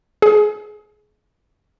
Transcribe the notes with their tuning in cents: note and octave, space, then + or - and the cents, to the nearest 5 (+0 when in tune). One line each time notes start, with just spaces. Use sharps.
G#4 +25